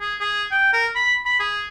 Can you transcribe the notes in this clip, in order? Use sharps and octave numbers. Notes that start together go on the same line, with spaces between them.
G#4
G#4
G5
A#4
B5
B5
G#4